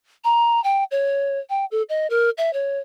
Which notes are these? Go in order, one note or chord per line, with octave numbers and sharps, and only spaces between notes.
A#5
G5
C#5
G5
A4
D#5
A#4
E5
C#5